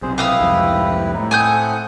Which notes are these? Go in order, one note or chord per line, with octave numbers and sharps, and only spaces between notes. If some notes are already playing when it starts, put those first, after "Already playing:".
B1 C3 G#4 C5
E4 G4 B4 F5 D#6 E6
C2 F2 G#2
A2 D#4
C4 A4 F#5 G#5 D#6 G6